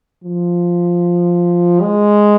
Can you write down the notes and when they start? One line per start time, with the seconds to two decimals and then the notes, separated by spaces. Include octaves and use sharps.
0.24 F3
1.82 G#3